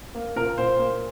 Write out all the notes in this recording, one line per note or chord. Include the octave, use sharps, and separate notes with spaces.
A#3
A#2 A#4
A#2 C5
A#3